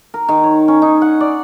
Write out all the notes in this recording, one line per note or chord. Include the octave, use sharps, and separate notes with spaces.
A#4
D#3
C#5
C#4
D#4
F#5
D5